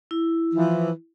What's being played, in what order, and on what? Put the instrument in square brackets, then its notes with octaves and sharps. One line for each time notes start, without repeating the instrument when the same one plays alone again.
[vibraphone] E4
[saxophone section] E3 F3